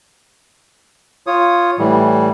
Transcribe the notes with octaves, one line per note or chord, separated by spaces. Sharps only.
F4 C#5 D#6
A2 E3 G3